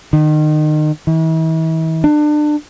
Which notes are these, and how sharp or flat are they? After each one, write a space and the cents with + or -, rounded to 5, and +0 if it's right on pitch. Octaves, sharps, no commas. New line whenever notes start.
D#3 -30
E3 -40
D4 +30